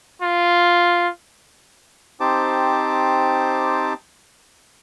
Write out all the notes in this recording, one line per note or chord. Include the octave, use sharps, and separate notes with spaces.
F4
C4 D#4 G4 C5 A5 D6